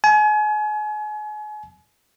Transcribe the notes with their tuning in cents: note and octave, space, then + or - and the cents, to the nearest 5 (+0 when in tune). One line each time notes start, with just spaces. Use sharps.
G#5 +35